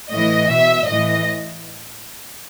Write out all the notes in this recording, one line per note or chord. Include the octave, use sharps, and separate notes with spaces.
A2 E3 D#5
B2 E5
A2 E3 D#5